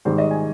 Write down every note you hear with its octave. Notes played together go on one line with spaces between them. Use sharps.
G#2 D#3 G3 C5
D#5
G#5